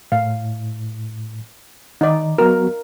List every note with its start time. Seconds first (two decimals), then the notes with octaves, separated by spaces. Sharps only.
0.12 A2 F5
2.01 D#3 D#4 D5
2.38 F#3 B3 F#4 A#4